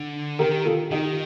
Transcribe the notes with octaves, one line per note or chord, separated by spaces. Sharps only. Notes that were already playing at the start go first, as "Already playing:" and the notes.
Already playing: D3
D#3 G4 A#4
F4 A4
D#3 D#4 G4